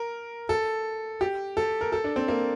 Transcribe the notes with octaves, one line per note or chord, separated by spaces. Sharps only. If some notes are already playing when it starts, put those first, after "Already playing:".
Already playing: A#4
A4
G4
A4
A#4
A4
D4
C4
A#3